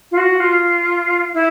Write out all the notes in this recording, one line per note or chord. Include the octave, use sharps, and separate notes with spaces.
F4
F#4
F4
E4